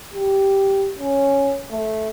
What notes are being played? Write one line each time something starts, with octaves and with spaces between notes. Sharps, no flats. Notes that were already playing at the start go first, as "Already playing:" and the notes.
G4
C#4
A3